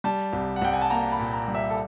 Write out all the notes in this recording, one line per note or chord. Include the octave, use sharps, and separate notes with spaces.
G3 A5
C2
F#5
C2 G5
G#5
A5
A#3 A#5
B5
A#2
A#5
G3
E5
A4